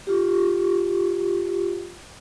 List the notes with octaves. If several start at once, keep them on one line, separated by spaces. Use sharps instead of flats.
F4 G4